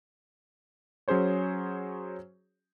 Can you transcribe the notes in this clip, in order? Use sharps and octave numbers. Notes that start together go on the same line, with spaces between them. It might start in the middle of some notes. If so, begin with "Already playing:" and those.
F#3 C#4 G#4 C5 C#5